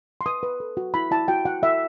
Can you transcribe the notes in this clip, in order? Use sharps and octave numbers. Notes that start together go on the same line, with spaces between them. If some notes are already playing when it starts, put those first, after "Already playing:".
C6
B4 D#6
B4
A4
F#4
E4 B5
E4 A5
F#4 G5
F#4 F#5
E4 E5